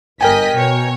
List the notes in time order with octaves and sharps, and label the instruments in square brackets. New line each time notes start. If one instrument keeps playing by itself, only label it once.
[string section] G1 D#5 B6 [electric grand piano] A#4 G5 G#5
[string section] B2 C#5